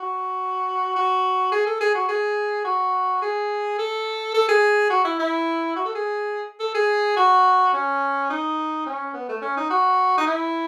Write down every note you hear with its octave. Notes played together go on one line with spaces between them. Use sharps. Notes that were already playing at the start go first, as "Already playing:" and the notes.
Already playing: F#4
F#4
G#4
A4
G#4
F#4
G#4
F#4
G#4
A4
A4
G#4
F#4
E4
E4
F#4
A4
G#4
A4
G#4
F#4
C#4
D#4
C#4
B3
A3
C#4
D#4
F#4
D#4
E4